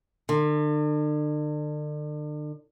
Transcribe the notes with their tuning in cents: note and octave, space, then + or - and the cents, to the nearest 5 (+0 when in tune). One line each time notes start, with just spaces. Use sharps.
D3 +40